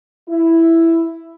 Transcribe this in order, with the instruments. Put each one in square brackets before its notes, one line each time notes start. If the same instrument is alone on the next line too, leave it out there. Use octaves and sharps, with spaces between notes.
[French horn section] E4